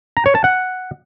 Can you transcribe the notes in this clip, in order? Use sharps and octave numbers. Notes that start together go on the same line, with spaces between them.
A#5
C#5
A5
F#5